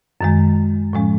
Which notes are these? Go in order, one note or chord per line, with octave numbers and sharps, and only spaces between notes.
F#2 D#3 G#3
A2 F3 G#3 C#4